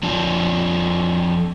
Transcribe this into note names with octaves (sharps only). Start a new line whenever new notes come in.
F2 F3 D4